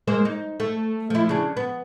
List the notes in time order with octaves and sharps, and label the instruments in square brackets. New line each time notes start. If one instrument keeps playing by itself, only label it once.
[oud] G#3 A#3 C5
D#4
A3
F3 E4
C#3 D4
B3